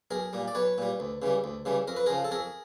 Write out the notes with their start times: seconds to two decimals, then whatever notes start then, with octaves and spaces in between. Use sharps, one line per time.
0.11 B1 G#4 A#4
0.33 A#2 G3
0.48 D5
0.55 B1 B4 C#5
0.78 A#2 G3
1.00 D2
1.22 C#3 E3 G3
1.44 D2
1.65 C#3 E3 G3
1.88 F2 A#4
1.96 B4
2.06 C#3 F3 G#4 A#4
2.24 A4
2.31 F2 G#4 A#4